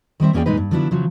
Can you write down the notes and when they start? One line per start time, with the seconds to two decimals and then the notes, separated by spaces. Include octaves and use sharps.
0.20 D#3 G3 C4 E5
0.33 E2 A#3 C#4 G#4 D5 G5
0.46 F#2 A#2 G#3 D#4 B4
0.57 G2
0.71 D3 F3 F#3 B3 D4 E4
0.91 C#3 F3 F#3